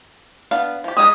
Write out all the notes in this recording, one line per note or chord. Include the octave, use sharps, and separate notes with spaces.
B3 D4 F5
F3 G4
G3 G#3 C4 D#6